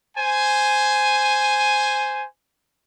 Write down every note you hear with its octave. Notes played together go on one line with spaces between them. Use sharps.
C5 G#5